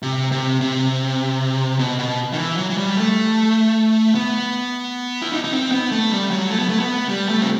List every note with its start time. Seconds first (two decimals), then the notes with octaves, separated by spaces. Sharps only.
0.03 C3
0.32 C3
0.61 C3
1.79 B2
1.99 B2
2.33 D#3
2.38 E3
2.57 F#3
2.70 F#3
2.77 G3
2.97 A3
4.15 B3
5.22 E4
5.33 D#4
5.44 D#4
5.52 C4
5.72 B3
5.92 A3
6.11 G3
6.31 F#3
6.50 A3
6.59 B3
6.69 A3
6.80 B3
7.09 G3
7.29 A3
7.42 C4